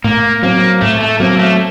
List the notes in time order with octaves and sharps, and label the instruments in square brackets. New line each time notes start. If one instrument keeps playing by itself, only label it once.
[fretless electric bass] A2 [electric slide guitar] A#3
[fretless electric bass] F#3 C4 [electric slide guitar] A#3
[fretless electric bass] A2 [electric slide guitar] A3
[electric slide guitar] A3
[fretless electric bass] F#3 C4 [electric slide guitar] A#3
[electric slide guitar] A3